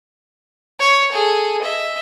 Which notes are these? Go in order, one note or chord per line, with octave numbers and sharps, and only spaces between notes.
C#5
G#4 A4
D#5 E5